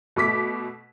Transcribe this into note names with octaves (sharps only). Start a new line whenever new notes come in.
B2 A3 D6 B6